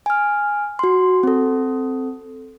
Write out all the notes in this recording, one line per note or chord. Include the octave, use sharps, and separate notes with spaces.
G#5 F6
F#4 C6
C4 A4